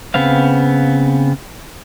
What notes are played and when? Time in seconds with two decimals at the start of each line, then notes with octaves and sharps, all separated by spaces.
0.14 C#3 B3 C4 F5